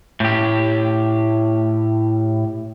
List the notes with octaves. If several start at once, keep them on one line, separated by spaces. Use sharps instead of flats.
A2 G4